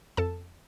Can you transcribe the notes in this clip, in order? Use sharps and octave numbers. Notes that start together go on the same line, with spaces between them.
F2 A4 A5